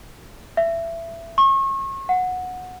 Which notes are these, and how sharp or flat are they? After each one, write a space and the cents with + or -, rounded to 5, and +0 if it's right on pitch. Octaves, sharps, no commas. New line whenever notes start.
E5 +20
C#6 -35
F#5 -15